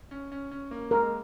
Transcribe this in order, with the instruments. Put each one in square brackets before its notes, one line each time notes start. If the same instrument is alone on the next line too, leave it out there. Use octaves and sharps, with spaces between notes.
[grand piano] C#4
C#4
C#4
A#3
[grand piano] G#3 [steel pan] A#4